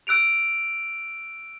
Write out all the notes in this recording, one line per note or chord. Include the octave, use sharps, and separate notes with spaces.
E6 F#6 D7 F7